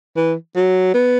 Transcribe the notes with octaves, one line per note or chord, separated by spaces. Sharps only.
E3
F#3
B3